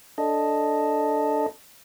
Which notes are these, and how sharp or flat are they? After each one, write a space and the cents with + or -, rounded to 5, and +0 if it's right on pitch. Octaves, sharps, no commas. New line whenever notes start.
D4 +0 A4 +0 D#5 +0